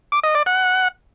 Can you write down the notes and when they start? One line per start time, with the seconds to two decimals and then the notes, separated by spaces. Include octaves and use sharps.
0.12 D6
0.24 D#5
0.35 D5
0.46 F#5